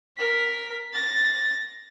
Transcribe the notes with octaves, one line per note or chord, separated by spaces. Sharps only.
A#4 B6
A6 A#6